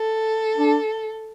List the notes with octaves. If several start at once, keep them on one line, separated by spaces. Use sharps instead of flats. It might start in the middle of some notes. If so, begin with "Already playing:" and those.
Already playing: A4
D4